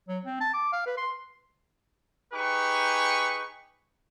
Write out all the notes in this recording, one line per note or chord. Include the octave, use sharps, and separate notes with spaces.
F#3
C4
A5
D6
F5
B4
C6
D#4 G4 G#4 B4 C#6